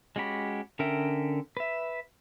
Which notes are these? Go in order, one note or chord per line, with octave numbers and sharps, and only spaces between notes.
G#3 C#4 F#4 G4 B5
D3 C#4 A#4 E5 G5
B4 E5